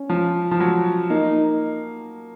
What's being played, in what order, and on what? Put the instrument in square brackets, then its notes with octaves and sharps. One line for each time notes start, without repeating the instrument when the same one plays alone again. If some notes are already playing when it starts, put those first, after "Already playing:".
Already playing: [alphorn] C#4
[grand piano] F3
F3
F#3
[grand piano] A#3 [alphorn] D#4